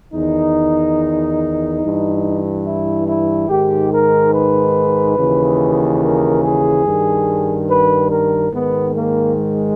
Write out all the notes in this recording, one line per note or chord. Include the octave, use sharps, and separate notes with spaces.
E2 D#3 D#4
G2 E3
E4
E4
G#2 D#3 G4
A#4
B4
D#2 C#3 E3
A#4
G#4
G2 D#3
B4
A#4
G#2 D#3 B3
A#3
G#3